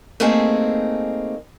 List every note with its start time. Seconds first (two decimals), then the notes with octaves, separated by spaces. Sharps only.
0.20 A3 A#3 C4 D#4 G#4